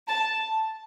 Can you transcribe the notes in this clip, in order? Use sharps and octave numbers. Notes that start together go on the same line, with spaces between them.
A5